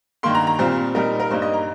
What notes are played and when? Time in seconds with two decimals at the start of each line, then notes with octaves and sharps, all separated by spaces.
0.23 G2 D#3 A#3 C6
0.35 A#5
0.47 A#5
0.59 A#2 G3 C4 F4 C5
0.95 A#2 G3 D#4 A#4
1.20 A#4
1.30 G2 G3 A#3 D#4 C5
1.42 D#5
1.54 A#5